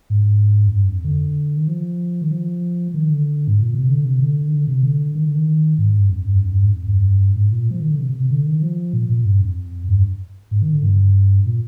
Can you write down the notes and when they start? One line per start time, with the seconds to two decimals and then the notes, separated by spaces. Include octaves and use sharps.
0.10 G#2
0.68 F2
0.73 G2
0.88 F2
1.05 D3
1.57 D#3
1.68 F3
2.22 D#3
2.31 F3
2.94 D#3
3.09 D3
3.48 G#2
3.61 A#2
3.74 C3
3.88 D3
4.05 C3
4.20 D3
4.48 D#3
4.52 D3
4.67 C3
4.83 D3
5.15 D#3
5.25 D3
5.35 D#3
5.78 G#2
5.98 G2
6.10 F2
6.25 G2
6.41 F2
6.52 G2
6.62 G#2
6.73 F2
6.88 G2
7.36 G#2
7.51 A#2
7.71 F3
7.80 D#3
7.90 D3
7.99 C3
8.09 C3
8.20 C3
8.31 D3
8.46 D#3
8.62 F3
8.93 A#2
9.09 A#2
9.25 G2
9.41 F2
9.88 G2
10.51 G#2
10.62 D#3
10.72 D3
10.83 G2
11.46 A#2